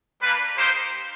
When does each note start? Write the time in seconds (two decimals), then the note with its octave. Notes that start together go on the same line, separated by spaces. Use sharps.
0.21 G3 A#3 D4 B4
0.57 A#3 D#4 G4 C5